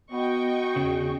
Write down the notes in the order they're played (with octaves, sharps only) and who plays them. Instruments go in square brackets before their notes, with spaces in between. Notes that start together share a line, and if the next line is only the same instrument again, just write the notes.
[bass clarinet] B3 [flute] F#4 [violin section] D#5 G5 C#6
[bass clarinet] E2 [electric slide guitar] C#3